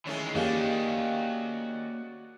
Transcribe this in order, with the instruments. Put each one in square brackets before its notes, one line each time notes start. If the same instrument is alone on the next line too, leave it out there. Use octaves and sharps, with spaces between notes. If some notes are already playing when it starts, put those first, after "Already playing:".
[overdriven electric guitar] D#3 E3 [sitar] G#3 A3 C#4
[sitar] D#3 C#4 [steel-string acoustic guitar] A#3 G4 F5 [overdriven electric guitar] F#4 D5